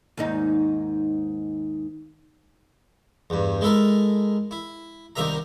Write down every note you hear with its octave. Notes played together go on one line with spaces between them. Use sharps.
D#2 G#2 D#4
E2 G2
G#3 E4 A4 A#4
E4
C2 C3 D#3 A#4 E5 A#5